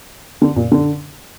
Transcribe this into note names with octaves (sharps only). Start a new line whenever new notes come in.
D3
A#2
D3